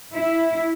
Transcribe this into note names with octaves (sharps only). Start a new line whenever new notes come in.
E4